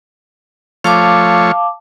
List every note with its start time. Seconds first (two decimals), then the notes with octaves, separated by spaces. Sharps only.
0.84 F3 A3 C#5 F5 A5 D6